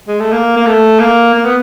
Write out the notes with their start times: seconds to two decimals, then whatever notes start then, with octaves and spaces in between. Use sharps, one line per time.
0.08 G#3
0.20 A3
0.32 A#3
0.57 A#3
0.67 A3
0.99 A#3
1.34 A#3
1.45 B3